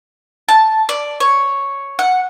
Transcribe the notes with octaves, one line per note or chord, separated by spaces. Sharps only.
A5
D5
C#5
F#5